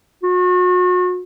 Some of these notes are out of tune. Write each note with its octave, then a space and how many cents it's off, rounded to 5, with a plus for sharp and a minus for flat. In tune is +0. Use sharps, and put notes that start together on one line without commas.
F#4 -40